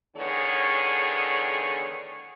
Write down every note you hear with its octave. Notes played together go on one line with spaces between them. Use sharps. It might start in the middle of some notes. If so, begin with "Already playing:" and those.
E2 A2 D3 D#3 G#4 C#5